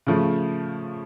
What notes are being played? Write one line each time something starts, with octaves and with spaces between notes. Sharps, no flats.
C#3 F3 A3